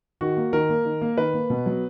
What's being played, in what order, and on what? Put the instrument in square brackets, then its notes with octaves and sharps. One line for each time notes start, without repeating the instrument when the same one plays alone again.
[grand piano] D#3 F#4
A#3
D#3 A#4
A#3
D#3
A#3
D#3 B4
A#3
B2
F#3 B3